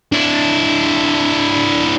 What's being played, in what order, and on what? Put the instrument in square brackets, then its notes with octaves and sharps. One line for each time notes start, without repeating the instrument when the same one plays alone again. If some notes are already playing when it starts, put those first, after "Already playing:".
[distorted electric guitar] D4 E4